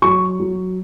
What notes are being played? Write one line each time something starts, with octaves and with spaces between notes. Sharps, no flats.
F#3 C#6
F#3